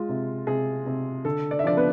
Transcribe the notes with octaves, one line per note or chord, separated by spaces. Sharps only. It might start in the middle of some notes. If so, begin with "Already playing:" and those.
Already playing: G#3 F4
C3
C3 G#4
C3
D3 A4
D5
E5
F3 D4 D5
B3 B4